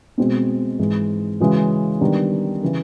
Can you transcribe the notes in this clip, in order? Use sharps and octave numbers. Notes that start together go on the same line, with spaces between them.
B2 G#3 C4
G#2 E3 G#3
C#3 E3 G#3 C#4 F#4
D#3 G3 B3 D4
C#3 E3